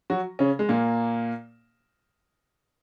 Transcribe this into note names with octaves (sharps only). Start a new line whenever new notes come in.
F#3 F#4
C#3 C#4
G#3
A#2 A#3